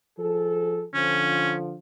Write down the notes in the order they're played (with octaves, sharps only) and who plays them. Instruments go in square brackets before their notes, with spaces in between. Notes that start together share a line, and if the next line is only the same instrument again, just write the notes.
[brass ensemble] F3 G#4 A4
[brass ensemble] D3 F3 [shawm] C#4